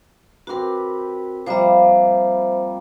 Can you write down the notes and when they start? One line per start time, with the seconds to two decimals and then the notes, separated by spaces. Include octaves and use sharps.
0.47 C4 F#4 G4 A#4 B4
1.46 F3 G3 A#3 C5 E5